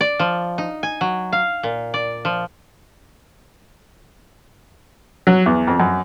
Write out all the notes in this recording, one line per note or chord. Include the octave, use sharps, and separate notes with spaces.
D5
F3
D#4
G#5
F#3
F5
A#2
D5
F3
F#3
E2
F2
F#2